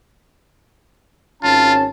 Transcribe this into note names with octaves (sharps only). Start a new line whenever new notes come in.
G#1 C#4 F4 A5